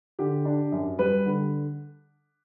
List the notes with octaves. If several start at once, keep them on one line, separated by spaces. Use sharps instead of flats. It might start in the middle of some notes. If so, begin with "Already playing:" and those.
D3 G4
D4
F#2
G3 B4
D3